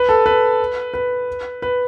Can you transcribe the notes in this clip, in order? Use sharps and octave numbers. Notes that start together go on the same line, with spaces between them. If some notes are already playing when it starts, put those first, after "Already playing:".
Already playing: B4
A4
B4
B4
B4